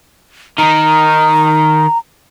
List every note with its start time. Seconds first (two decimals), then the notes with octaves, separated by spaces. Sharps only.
0.58 D#3 D#4 A#5